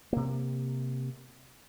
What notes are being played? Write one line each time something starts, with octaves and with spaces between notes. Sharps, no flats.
C3 A#3